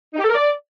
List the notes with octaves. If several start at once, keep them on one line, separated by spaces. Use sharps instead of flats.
D#4
G4
A4
A#4
D5